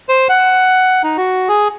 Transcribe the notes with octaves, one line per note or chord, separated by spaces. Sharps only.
C5
F#5
D#4
F#4
G#4